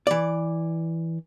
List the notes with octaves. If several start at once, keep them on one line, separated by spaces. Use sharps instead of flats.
E3 D5